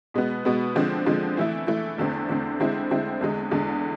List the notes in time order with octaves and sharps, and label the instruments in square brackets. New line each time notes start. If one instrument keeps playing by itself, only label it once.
[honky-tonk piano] B2 G#3 B3
B2 G#3 B3
D3 F3 G#3 C4
D3 F3 G#3 C4
E3 A3 E4
E3 A3 E4
E2 D3 A3 C4
E2 D3 A3 C4
D3 G#3 C4 E4
D3 G#3 C4 E4
E2 D3 G#3
E2 D3 G#3